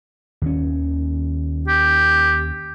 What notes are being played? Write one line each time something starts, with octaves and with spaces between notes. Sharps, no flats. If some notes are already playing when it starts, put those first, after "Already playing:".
D#2 D#3 C#4
G4